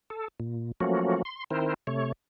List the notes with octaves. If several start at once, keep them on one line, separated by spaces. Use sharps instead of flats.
A4
A#2
F3 F#3 A3 A#3 C#4 F#4
C6
D#3 C4 E4 A#4 C5
C3 A3 C#5